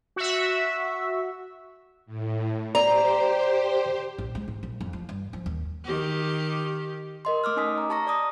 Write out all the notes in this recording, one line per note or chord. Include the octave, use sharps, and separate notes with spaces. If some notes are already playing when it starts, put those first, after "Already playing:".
F#4 E5
A2
G4 C5 D5 A#5
A#1
G#3
G#2
A#1
F2
F3
G2
F3
D#2
D#3 G4
A#4 D#5 C6
A3 D6 E6 F6
C#4 D#4 D#5 G#5 D#6 B6
A#5
G4 A5 A#5 C#6 A#6
D5 D6 D#6 A#6